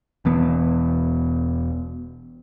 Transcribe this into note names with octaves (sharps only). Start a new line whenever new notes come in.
E1 E3 B3